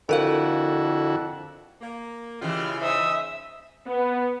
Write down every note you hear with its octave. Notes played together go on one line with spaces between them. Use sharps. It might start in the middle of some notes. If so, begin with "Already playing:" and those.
F2 D3 E4 F#4 A4 A#4 F5
A#3
C#3 E3 G3 G#3 F4
C#4 D#4 C5 E5 D#6 E6
B3